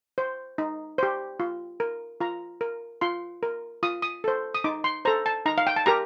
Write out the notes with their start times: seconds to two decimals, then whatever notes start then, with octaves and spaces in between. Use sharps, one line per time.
0.18 C5
0.58 D#4
0.98 G4 C5
1.40 F4
1.80 A#4
2.20 F4 A#5
2.61 A#4
3.01 F4 C6
3.43 A#4
3.83 F4 D#6
4.02 D#6
4.24 A4 C5
4.55 D#6
4.64 D#4 D6
4.84 C6
5.05 A4 C5 A#5
5.26 A5
5.46 D#4 A#5
5.58 F5
5.67 G5
5.76 A5
5.86 G4 A#4 A#5